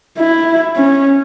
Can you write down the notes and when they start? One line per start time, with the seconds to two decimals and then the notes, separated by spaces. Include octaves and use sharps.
0.19 E4
0.76 C#4